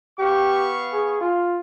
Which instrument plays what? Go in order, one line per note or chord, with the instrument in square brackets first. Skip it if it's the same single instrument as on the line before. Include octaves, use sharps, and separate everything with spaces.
[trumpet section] B3 F5 C#6 [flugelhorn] G4
[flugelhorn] G#4
F4